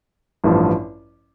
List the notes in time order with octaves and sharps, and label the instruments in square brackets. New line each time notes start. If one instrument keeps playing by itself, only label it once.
[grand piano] A1 G2 F3